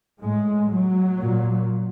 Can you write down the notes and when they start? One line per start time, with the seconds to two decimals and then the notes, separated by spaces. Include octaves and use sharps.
0.21 A2 G#3
0.71 F#3
1.20 A#2